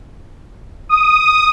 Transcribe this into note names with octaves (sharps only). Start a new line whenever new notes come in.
D#6